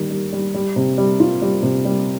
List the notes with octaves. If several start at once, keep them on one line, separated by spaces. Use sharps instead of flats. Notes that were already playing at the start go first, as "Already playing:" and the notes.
Already playing: D#3 G3
G3
G3
G3
C3
G3
F4
G3
C3
G3